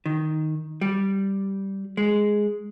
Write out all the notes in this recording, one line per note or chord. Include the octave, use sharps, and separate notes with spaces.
D#3
G3
G#3